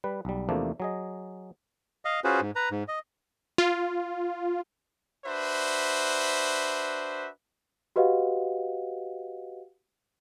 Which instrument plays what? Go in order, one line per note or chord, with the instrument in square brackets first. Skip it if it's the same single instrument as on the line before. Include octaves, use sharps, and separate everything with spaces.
[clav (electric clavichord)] G3 B4
B1 G3
E2 C3 F3 A3 A#3 D4
F#3 G#4 D#5
[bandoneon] D#5 F5
C#4 F4 F#4 G#4 B4 C5
G#2
B4 A#5
G#2
D#5
[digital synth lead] F4
[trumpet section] D4 F#4 B4 C5 E5
[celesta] F#4 G4 B4 D#5 F5 F#5